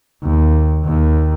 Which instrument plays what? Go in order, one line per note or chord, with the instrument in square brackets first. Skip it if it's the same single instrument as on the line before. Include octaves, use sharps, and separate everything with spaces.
[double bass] D#2
D#2